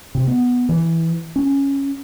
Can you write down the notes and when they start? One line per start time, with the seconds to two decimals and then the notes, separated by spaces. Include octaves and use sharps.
0.15 C3
0.27 B3
0.69 E3
1.36 C#4